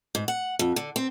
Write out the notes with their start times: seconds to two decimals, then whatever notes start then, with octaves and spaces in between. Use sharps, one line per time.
0.15 G#2
0.28 F#5
0.59 F2
0.76 D3
0.96 C4